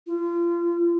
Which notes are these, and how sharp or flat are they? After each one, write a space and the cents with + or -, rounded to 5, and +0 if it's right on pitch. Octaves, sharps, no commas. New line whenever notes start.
F4 -30